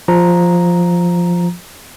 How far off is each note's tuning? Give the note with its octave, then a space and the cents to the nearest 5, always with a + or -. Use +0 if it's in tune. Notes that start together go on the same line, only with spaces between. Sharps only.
F3 +0 A#5 +0